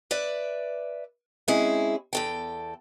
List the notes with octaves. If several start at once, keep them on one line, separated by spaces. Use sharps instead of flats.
B4 D5 E5
G#3 C4 C#4 E4 G#4
E2 A4 G5